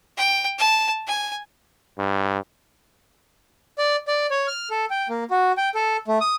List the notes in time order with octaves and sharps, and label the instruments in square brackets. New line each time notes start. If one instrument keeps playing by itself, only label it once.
[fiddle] G5
A5
G#5
[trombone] G2
[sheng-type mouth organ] D5
D5
C#5
F6
A4
G5
A#3
F#4
G5
A4
A3
D#6